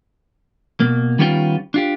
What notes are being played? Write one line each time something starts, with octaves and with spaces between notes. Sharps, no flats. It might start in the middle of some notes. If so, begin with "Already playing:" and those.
B2 A#3
D#3 G3 B3 C#4 F4 G5
D4 F4 G4